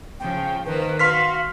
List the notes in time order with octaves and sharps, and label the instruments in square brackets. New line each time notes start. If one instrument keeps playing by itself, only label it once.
[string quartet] C#3 F3 [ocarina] G5
[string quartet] D#3 A#3 C5 [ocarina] B4
[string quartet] F#4 [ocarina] F5 [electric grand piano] C6 F6 B6